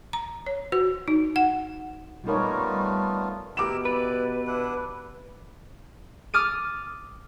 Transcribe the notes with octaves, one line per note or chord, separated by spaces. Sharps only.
A#5
C#5
F#4
D#4
F#5
G3 A3 B3 D#4 F4 A#4 C#5
B2 E4 G4 A#4 D6 E7
E4 B4 D5
D4 E4 F#5
D6 D#6 F6 A6 D#7